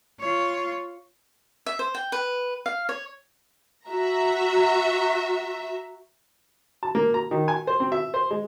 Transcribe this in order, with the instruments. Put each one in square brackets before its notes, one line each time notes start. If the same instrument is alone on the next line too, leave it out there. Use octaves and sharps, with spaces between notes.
[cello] F4 C#5
[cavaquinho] E5
C5
G5
B4
F5
C#5
[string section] F#4 E5 A#5
[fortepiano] A5
A#3
A#5
D#3
G#5
C5
C4
E5
C5
G#3